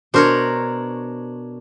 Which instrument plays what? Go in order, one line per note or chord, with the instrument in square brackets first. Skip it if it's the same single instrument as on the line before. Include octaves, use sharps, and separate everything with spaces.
[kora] B2 C5 [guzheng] D4 A#4 C#5